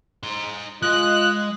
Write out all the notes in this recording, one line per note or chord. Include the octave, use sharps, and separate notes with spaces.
D#4 C6
G#3 F4 D#5 F#6